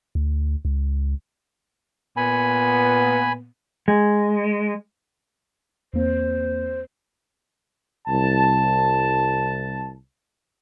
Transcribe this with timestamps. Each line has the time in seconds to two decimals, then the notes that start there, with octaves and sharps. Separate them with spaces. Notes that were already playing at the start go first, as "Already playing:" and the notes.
0.15 D2
0.65 C#2
2.17 A#2 B3 G#5 B5
3.88 G#3
5.93 E2 A#3 C4 C5
8.07 C2 A5